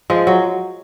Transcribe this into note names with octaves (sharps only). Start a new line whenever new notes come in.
F3 G#3
F#3